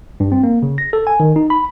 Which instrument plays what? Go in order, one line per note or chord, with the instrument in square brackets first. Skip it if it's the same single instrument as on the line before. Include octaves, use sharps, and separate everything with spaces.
[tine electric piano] G2
C4
A#3
C#3
A#6
A4
G#5
D#3
D#4
B5